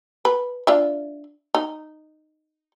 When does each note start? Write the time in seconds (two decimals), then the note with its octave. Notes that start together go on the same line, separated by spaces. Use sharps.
0.25 B4
0.67 D4 F4 E5
1.55 D#4